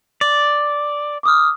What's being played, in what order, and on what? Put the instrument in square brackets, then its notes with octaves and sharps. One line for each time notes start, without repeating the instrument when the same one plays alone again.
[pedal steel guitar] D5
[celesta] D6 D#6 F6